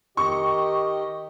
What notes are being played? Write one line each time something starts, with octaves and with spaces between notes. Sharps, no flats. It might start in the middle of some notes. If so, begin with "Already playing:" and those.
D#3 G4 D#5 C#6